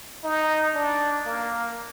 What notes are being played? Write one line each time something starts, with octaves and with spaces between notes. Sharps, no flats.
D#4
D4
A#3